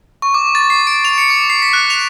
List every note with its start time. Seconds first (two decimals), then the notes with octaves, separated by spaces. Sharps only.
0.22 C#6
0.34 D6
0.55 A6
0.70 C7
0.87 D7
1.05 F7
1.18 C#7
1.30 D6
1.50 C7
1.62 B6
1.73 F#6
1.90 F7